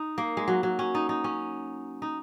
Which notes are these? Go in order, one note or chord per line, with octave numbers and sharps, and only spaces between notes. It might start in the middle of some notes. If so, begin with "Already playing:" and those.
Already playing: D#4
A#3
G#3
F#3
F#3
C#4
D#4
D#4
C#4
D#4